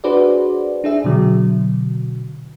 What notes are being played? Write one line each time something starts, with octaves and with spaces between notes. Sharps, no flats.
D4 F#4 G#4 B4 C5 D5
D4 G#4 E5
B2 D3 F#3